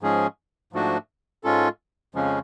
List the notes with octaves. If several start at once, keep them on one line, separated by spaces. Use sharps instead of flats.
G#2 F3 G#3 C#4 G#4
G#2 F3 A3 D4 F#4
G#2 G#3 C#4 F4 A4
F2 C#3 F3 G#3 C#4